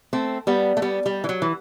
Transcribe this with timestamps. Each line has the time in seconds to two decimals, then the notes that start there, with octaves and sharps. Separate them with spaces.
0.13 A3 C4
0.47 G3 B3
0.77 A3
0.82 G3 B3
1.06 G3
1.24 E3
1.29 F#3
1.42 E3